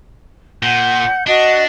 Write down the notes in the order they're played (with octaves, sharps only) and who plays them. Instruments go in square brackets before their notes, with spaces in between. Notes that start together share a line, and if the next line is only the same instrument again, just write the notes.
[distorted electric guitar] A#2 [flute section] F#5 G6
[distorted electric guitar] D4 [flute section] F#4 D#5 F#5